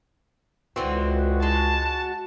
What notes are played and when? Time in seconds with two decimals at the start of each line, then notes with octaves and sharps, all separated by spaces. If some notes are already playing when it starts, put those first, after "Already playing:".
0.76 C#2 D3 E3 C4 F#4
1.43 G#3 A5